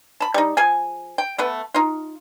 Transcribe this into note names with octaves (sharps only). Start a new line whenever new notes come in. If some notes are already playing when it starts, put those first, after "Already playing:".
A5 B5
G3 D#4
F3 G#4 G#5
G5
A3 B3 B4
D#4 F4